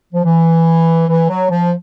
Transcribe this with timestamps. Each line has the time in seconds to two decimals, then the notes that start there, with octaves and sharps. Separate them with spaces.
0.14 F3
0.24 E3
1.08 E3
1.29 F#3
1.50 F3